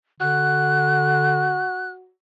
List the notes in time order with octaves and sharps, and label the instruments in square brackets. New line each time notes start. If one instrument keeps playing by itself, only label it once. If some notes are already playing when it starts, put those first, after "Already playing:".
[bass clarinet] D3 [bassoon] F#4 [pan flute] F#6